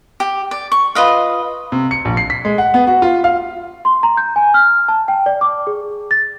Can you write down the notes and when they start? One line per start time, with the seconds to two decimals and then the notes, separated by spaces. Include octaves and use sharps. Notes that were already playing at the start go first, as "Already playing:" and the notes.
0.20 G4
0.51 D5
0.72 C#6
0.95 F4 B4 D#5 F5
1.72 C3
1.91 C#7
2.05 A#1
2.17 C7
2.30 B6
2.45 G#3
2.58 F#5
2.74 B3
2.87 F#4
3.02 F4
3.24 F5
3.85 C6
4.03 A#5
4.17 G6
4.36 G#5
4.54 F6
4.88 A5
5.08 G5
5.26 D5
5.41 D6
5.67 G#4
6.11 A6